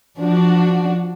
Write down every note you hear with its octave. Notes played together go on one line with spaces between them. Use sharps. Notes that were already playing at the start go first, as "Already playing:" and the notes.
F3 D4 F#4